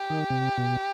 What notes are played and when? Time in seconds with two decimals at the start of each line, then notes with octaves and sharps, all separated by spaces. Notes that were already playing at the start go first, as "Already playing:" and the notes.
Already playing: G4
0.10 D#3
0.30 C3
0.58 B2